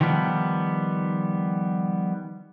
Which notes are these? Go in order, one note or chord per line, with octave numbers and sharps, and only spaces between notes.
D#3 F3 G3 B3